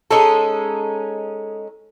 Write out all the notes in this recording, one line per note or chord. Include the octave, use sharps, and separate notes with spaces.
G#3 C#4 D#4 A4